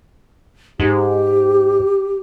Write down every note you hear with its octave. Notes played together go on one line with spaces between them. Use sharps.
G#2 G4